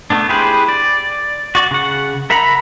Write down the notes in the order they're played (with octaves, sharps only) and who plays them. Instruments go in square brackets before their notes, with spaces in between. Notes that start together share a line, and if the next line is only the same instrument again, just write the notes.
[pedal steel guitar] A3 B3 D4
E4 G4 G#4 B4 C5
D5
F#4 D5
C#3 F#5
A#4 E5 F#5 A#5 B5